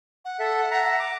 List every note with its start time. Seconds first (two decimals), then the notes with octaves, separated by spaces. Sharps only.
0.25 F#5
0.39 A4 E5
0.71 E5 A#5
1.00 D6